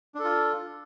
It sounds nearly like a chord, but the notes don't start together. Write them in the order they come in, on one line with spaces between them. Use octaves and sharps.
D4 A4 F4